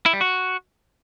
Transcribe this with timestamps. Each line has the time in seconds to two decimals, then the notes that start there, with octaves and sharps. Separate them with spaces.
0.06 E4
0.13 G3
0.21 F#4